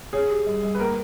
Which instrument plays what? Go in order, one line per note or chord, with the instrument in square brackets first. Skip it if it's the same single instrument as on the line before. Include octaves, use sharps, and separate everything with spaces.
[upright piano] G#4 [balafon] C#5
[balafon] G4
G3
G3
[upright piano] B4
[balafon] A#3 [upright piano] A#4